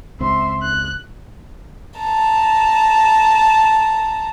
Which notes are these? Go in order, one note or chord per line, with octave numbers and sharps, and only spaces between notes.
C#2 C4 E5 C6
F#6
A5 A#5